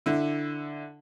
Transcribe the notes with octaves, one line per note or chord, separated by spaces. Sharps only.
D3 E4